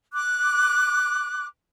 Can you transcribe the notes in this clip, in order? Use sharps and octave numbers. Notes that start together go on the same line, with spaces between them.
D6 F#6